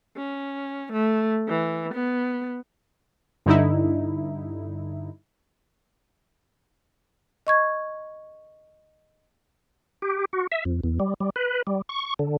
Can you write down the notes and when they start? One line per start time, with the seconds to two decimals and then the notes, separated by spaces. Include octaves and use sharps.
0.16 C#4
0.93 A3
1.48 E3
1.94 B3
3.46 G2 D3 D#4 E4
7.47 D#5 C#6 G#6
10.02 G4
10.33 F#4
10.52 E5
10.65 F2
10.83 E2
11.00 G3
11.20 G3
11.36 B4
11.67 G3
11.89 C#6
12.19 D3